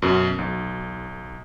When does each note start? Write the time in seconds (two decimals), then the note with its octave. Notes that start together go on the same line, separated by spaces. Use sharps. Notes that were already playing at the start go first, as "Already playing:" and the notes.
0.02 F#2 B2
0.39 B1